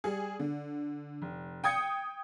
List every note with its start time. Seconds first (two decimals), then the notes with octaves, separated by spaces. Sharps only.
0.04 G3 G#4
0.39 D3
1.22 F1
1.64 G5 D#6 G#6 C#7